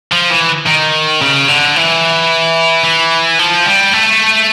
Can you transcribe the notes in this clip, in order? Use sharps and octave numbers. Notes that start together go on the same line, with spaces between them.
F3
E3
D#3
C#3
D3
E3
E3
F3
G3
A3